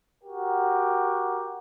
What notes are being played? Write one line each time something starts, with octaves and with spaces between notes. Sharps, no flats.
F#4 G4 A#4